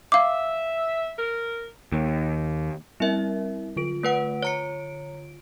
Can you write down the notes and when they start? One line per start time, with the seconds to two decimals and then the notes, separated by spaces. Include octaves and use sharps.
0.12 E5 F5 D6
1.18 A#4
1.92 D#2
3.00 G3 C4 E4 A#4 E5
3.76 D3 F4 D7
4.03 A3 B4 F#5
4.43 C#5 A#5 C#7